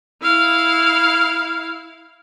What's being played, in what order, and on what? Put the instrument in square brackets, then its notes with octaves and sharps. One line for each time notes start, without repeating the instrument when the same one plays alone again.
[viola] E4 F5